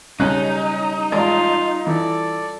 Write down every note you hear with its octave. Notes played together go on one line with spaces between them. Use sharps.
B1 C#3 G3 C#4 D#4 F#6
A1 G#3 F4 D5
E3 A4 D5